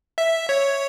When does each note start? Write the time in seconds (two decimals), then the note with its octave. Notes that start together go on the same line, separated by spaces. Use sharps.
0.18 E5
0.49 C#5